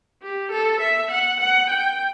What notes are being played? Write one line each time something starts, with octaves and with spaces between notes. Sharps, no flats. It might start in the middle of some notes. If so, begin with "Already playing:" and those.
G4
A4
E5
F#5
F#5
G5